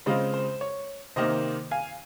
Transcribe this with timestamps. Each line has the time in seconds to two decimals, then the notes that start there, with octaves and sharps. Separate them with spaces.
0.06 C#3 G#3 C4 F4 C5 D#5
0.34 C5
0.61 C#5
1.16 C3 D#3 A#3 D#4 C5 D#5
1.71 F5 G#5